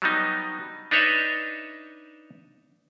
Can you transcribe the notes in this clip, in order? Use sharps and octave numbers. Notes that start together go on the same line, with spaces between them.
F#3 G3 B3 D#4
D4 D#4 B4 C#5 D#5 E5